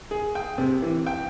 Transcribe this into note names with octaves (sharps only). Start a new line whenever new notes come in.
G#4
G5
C3
E3
G5